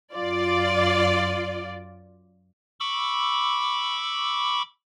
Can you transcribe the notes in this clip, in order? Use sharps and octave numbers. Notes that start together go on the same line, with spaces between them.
F#2 F4 D5
B5 C#6 D6 E6